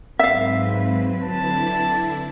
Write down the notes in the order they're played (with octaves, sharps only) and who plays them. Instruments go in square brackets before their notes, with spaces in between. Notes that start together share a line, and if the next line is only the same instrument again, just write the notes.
[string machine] G#2 [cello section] F#3 C4 B4 [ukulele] E5 F5
[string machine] D3 D4 E4 [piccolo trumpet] A5